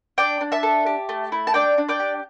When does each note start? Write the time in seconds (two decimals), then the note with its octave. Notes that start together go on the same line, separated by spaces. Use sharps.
0.18 D4 D5 G5
0.41 D4
0.52 E5 A5
0.63 A4
0.86 G4
1.09 A3
1.32 E4
1.47 A5
1.54 D4 D5 G5
1.78 D4
1.89 D5 G5
2.00 G4